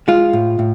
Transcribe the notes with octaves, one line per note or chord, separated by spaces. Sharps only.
G#3 F4
A2
A2